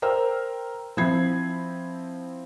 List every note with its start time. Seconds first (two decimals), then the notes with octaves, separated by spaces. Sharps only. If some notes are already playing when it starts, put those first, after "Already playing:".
0.02 A#4 C5 G5 E6 F6
0.97 F3 C4 E4 B5 G#6 C7